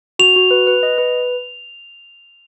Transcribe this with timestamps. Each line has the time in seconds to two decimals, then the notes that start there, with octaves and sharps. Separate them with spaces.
0.19 F#4 F7
0.36 F#4
0.51 B4
0.67 B4
0.83 D#5
0.98 B4